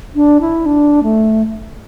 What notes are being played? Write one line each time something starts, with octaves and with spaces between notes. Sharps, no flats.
D4
E4
D4
A3